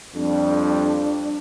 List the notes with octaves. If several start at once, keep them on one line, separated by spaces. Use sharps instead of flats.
F2 G3 D4